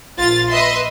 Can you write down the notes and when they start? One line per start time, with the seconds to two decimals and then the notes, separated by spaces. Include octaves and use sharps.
0.17 A#1 F4 A6
0.50 B4 D#5 E5 C6